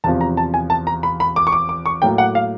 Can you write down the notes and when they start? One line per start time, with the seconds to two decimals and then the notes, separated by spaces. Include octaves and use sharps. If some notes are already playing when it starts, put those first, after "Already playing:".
0.04 E2 C3 F3 A5
0.21 A#5
0.37 A5
0.54 G#5
0.70 A5
0.87 A#5
1.03 B5
1.20 B5
1.36 D6
1.47 C#6
1.52 D6
1.69 D6
1.86 C#6
2.02 A2 F#3 A#3 G5
2.18 F#5
2.35 F5